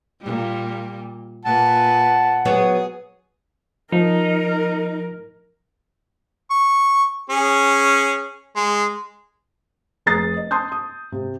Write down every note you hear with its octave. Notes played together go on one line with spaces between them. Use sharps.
A#2 G3
A#2 B4 F#5 A5
F#3 B3 G#4 C#5
F3 D#4 A#4
C#6
C#4 G#4
G#3
F1 G#4 A#5 D#6 A6 C7
D#5
A5 C6 D#6 G6
D#6
C3